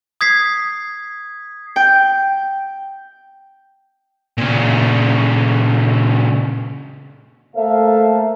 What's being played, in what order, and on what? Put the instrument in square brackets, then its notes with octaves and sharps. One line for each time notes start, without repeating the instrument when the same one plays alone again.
[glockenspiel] D#6 G#6 B6 C7
[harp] G5
[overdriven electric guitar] A#2 C#3
[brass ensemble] A3 A#3 A4 C5 E5 F5